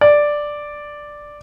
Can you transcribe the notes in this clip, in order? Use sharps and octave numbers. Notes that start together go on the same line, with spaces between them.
D5